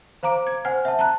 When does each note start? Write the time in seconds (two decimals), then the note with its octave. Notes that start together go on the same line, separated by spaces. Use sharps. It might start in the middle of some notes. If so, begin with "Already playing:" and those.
0.23 C5 F5 A#5 D6 D7
0.47 G#6
0.65 C5 F#5 G#5 F6
0.85 E5 A5
0.99 A5 A#5 F#6